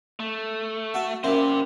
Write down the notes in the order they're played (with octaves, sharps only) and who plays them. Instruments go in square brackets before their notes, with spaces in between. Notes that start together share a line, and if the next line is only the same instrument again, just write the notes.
[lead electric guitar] A3
[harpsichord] F#4 A4
[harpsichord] F#2 A#2 E4 [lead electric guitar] G4 C5